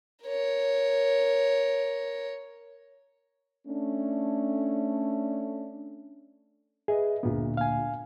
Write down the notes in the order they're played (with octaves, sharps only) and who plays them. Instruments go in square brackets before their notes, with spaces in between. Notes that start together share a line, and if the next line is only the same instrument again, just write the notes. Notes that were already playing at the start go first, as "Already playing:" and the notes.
[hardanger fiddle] A#4 C#5
[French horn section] A3 C#4 D4
[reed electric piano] G#4 [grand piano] B4 D#5 E5
[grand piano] D2 A#2 D3 [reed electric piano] B3
[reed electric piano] F5 G#5